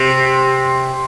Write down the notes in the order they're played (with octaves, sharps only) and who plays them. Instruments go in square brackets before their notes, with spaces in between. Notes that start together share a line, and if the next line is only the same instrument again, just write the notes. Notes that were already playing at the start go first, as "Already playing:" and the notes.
Already playing: [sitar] C3